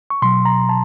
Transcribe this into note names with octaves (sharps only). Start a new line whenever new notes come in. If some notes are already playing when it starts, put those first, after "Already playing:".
C#6
B2 F#3 C6
A#5
A5